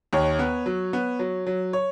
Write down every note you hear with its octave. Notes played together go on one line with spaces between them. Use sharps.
D#2 C#5
B3
F#3
B3
F#3
F#3
C#5